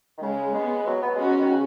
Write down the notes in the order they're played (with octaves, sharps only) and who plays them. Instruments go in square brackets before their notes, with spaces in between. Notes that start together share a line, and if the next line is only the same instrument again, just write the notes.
[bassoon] D#3
[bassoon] C#3 [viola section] G#3
[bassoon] G#3 [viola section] B3
[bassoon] F#3
B3
[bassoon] G#3 [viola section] C#4 F#4
[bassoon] F#3
D#3
C#3